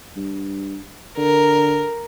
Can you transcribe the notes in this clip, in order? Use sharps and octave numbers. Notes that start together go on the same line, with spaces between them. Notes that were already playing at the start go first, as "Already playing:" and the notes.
G2
D3 A#4